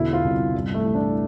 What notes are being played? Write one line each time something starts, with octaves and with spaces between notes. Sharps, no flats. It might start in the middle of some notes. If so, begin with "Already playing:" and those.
Already playing: E2 B2 D3 E4
F4
C2
G2
A3
E3
D4